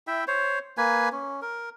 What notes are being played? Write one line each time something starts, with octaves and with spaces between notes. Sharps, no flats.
E4 E5 G5
C5 C#5
A#3 B4 G#5
C#4
A#4